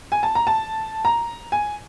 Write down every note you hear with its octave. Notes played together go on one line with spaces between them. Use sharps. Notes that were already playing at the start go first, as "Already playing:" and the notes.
G#5
A5
A#5
A5
A#5
G#5